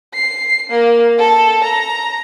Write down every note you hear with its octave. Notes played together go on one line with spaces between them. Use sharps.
C7
A#3
A4
A#5